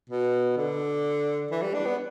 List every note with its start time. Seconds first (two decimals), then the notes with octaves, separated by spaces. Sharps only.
0.10 B2
0.57 D3
1.51 E3
1.62 G3
1.74 D4
1.86 B3